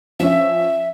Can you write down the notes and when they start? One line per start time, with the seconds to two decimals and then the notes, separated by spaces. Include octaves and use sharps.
0.20 F3 C#4 E5